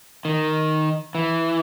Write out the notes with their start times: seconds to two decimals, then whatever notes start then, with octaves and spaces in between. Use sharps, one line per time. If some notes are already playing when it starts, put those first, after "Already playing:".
0.25 D#3
1.15 E3